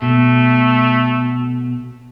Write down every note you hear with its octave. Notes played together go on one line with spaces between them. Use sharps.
B2 A3